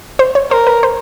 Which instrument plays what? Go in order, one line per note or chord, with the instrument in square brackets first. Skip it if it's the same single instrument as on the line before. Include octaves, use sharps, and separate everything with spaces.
[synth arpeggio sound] C5
C#5
[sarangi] A#4 [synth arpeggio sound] C5
[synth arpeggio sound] B4
C5